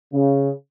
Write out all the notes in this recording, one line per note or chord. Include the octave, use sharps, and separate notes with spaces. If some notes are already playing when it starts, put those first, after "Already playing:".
C#3